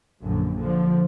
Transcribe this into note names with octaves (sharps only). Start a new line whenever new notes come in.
A#1 F#2 D3
D3 F3